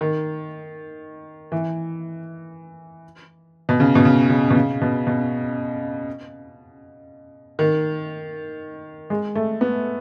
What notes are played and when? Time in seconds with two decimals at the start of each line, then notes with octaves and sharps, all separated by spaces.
0.01 D#3
1.52 E3
3.69 B2
3.80 C#3
3.95 B2
4.05 C#3
4.30 C#3
4.50 B2
4.55 C#3
4.81 B2
5.07 B2
7.59 D#3
9.10 G#3
9.35 A3
9.61 B3